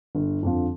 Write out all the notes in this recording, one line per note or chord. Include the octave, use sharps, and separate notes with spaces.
G1
F2 D3 F3